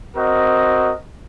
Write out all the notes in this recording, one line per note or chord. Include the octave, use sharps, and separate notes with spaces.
C4 F#4 A#4 D#5